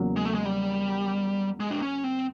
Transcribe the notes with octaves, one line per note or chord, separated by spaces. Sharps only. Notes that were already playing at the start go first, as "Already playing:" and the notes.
Already playing: E2 C#3 F#3 A#3
G#3
A3
G#3
G3
G#3
D4
C#4
C4